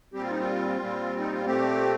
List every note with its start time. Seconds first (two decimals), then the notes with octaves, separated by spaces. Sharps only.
0.13 A#2 G3 C4 G4
0.23 F4
0.31 D#4
0.40 F4
0.80 A#2 G3 C4
1.19 D#4
1.33 F4
1.46 A#2 A3 C4 G4